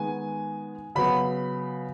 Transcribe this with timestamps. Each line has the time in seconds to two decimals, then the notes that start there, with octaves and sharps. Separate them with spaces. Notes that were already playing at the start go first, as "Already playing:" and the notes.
Already playing: D#3 G#3 B3 G#5
0.95 C#3 F#3 B3 B5